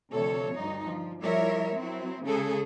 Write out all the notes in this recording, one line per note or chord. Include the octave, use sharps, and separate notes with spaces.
D2 C3 F3 A4 C#5
D2 G2 D#4
F3
F3 G3 E4 A#4 C#5 E5
F#3 C4 E4
C#3 G#3 G#4 A4